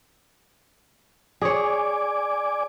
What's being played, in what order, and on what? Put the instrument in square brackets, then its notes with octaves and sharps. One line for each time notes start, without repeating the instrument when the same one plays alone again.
[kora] G#4 C#5 [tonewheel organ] D5 G#5 D6